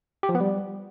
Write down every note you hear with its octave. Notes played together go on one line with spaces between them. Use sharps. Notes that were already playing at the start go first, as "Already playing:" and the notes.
G4
F3
B3
G3